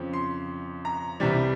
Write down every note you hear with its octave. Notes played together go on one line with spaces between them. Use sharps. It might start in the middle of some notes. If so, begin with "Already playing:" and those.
Already playing: F2 C#3 F3
C6
A#5
C2 C3 E3 G3